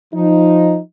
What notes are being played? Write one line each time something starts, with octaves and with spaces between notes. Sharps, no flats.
F3 D#4